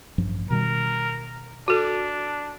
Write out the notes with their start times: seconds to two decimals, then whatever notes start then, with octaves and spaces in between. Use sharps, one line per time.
0.18 A1 G2 F3
0.50 B2 D#3 G3 A#4
1.68 D4 F#4 A4